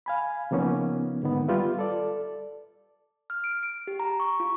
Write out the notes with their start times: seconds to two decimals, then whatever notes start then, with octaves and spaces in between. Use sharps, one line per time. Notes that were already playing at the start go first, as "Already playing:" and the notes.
0.06 F5 G#5 B5
0.51 C#3 F3 A#3 B3 C#4 D#4
1.23 G#2 D3 D#3 B3
1.48 G3 F4 G4 B4 E5
1.79 A4 D5
3.30 F6
3.44 D7
3.63 D7
3.87 G4
4.00 A#5
4.20 C#6
4.40 F4